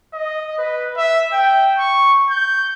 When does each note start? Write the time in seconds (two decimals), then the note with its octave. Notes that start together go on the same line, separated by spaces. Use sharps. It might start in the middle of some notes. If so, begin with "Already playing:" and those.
0.13 D#5
0.58 B4
0.97 E5
1.32 G5
1.78 C#6
2.30 G6